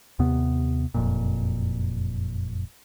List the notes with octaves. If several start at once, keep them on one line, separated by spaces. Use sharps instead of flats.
D#2 C3 B3
F#1 F2 A#2